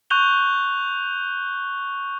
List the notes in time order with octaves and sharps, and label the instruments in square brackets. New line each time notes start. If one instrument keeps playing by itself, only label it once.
[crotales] C#6 F#6 G6 F7 G7